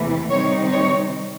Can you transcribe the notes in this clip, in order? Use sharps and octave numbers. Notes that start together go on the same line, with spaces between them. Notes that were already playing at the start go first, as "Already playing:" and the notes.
Already playing: E2 C3 E3 A3
C3 D#3 G3 C4 D#4 C#5
C#5